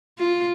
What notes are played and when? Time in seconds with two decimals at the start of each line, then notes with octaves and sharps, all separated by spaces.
0.19 F4